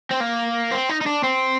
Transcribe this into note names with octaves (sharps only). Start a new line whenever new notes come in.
C4
A#3
C4
D#4
D#4
D4
C4